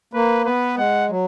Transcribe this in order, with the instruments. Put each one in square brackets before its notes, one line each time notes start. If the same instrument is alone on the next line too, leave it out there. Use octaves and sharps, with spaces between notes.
[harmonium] A#3 [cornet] B4
[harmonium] B3 [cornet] B4
[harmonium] G#3 [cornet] F#5
[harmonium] F#3